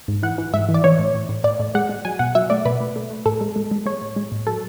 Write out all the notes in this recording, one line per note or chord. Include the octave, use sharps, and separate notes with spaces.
G#2
E3 F#5
E3
G#2 E5
E3
D5
E3 C#5
A2
A2
A2
A2 D5
A2
G#3 F#5
G#3
F#3 G#5
B2 F#5
F#3 E5
A3 D5
B2 B4
A3
A3
A3
A2 A4
G#3
G#3
G#3
G#3 C#5
A2
G#3
A2
F#3 A4